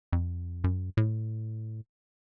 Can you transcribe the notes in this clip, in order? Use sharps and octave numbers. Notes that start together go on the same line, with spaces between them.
F2
F#2
A2